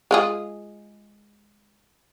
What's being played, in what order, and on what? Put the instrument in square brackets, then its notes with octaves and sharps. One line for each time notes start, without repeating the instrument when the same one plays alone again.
[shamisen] G#3 F4 G#4